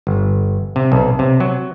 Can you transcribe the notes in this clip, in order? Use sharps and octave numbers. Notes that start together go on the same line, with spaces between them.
G1
C3
B1
C3
F#3